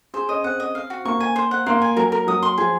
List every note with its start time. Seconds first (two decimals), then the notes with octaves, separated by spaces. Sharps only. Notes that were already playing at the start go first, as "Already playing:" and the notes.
0.14 G#4 C5
0.29 C#4 D#5
0.44 C4 F#5
0.60 D#5
0.75 F5
0.90 F#4
1.05 A#3 C#6
1.20 G#5
1.36 C5
1.51 F#5
1.66 A#3 C6
1.82 G#5
1.96 F#3 A#4
2.12 A#4
2.27 F#3 D#6
2.43 C6
2.58 F3 G#4